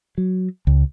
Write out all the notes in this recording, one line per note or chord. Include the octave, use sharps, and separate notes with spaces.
F#3
C#2